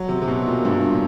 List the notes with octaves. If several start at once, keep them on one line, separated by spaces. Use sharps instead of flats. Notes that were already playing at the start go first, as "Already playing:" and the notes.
Already playing: F#3
C3
C3
B2
A#2
G2
A2